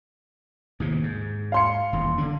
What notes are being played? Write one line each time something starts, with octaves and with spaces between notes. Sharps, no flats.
D#2 A2 C3
G#2
F5 C6 C#7
D#1 E2
D3 D4